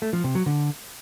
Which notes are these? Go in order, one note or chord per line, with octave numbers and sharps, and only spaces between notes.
A3
F3
C3
F#3
D3